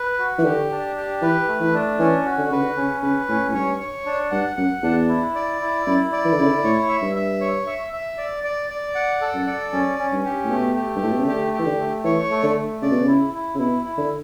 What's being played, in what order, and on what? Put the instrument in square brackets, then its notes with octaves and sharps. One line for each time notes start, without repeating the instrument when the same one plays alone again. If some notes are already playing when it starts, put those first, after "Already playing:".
Already playing: [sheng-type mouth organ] B4
F#4
[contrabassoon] E3
[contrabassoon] D3 [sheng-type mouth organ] G4
[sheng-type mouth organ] D4
G4
[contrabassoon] E3 [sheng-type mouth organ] B4
[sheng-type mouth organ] A3
[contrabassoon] E3
[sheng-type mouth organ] D4
[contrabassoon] E3 [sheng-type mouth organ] C#4
[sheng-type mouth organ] F#4
[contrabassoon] D3
[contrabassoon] C#3 [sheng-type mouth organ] B4
[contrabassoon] D3
[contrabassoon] C#3 [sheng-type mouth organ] C#4
[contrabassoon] C#3 [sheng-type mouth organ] B4
[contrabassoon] A2 [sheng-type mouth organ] C#4
[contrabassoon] A2
[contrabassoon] G2 [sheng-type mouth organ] C#5
[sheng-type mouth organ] C#5
D4
[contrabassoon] G2 [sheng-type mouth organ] F#5
[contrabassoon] F#2 [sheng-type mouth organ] F#5
[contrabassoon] E2 [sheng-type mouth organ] D4
[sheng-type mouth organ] E4
D5
E4
[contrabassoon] F#2 [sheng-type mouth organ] E4
[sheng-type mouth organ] D5
[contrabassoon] E3
D3
[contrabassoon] C#3 [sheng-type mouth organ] E4
[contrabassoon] D3
[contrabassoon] A2 [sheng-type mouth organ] C#5
[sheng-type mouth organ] E5
[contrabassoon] G2
[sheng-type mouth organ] E5
C#5
E5
E5
D5
D5
D5
F#5
A4
[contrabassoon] F#2
[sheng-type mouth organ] D5
[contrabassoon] F#2 [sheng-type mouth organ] C#4
[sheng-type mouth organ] C#4
[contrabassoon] G2
[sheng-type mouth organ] G4
[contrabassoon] A2
[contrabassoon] B2 [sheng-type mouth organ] A3
[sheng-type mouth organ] G4
[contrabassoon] G2
[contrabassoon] A2 [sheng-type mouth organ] A3
[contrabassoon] B2
C#3
[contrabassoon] D3 [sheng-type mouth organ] G4
[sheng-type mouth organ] G4
[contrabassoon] E3
D3
[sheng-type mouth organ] A3
[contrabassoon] E3 [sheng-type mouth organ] C#5
[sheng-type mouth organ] A3
[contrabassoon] D3
[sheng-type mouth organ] A3
[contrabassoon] C#3 [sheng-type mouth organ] D5
[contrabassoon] B2
C#3
[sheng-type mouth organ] E4
E4
[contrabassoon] C#3
[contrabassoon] B2 [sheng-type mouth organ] E4
[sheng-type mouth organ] E4
[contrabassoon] D3